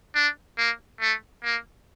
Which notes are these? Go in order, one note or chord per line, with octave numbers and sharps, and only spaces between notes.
D4
A#3
A3
A#3